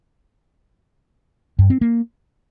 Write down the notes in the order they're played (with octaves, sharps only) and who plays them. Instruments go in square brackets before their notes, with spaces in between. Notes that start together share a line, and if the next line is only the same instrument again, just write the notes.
[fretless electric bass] G2
C4
A#3